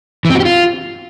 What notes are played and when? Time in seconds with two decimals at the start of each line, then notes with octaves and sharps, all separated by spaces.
0.25 E3
0.30 C4
0.35 F#4
0.40 G4
0.45 F4